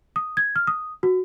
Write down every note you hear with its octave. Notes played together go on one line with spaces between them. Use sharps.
D#6
G#6
F6
D#6
F#4